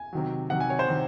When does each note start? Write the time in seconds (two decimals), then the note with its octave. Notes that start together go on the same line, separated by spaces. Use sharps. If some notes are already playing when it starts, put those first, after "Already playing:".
Already playing: G#5
0.13 C3 D#3 F#3
0.50 C3 D#3 F#3 F#5
0.60 G#5
0.70 C#5
0.79 C5
0.88 C3 D#3